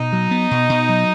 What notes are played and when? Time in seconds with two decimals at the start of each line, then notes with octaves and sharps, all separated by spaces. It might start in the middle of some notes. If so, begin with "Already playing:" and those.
Already playing: B2 D#4
0.13 F#3
0.31 B3
0.51 B2
0.69 B2
0.89 F#3